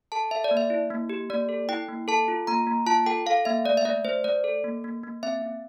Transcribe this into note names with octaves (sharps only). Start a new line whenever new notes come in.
A4 A5
A4 E5
D5
A#3
E5
E4
A#3
G4
A#3 D5
A4
E4 G5
A#3
A4 A5
F4
A#3 A#5
A#3
F4 A5
A4 G5
A4 F5
A#3 E5
A3 D5
E5
A3 D5
A3 C5
A3 D5
A4
A#3
A#3
A#3
C4 E5
C4